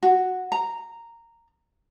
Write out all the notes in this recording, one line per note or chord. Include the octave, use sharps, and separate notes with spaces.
F#4
A#5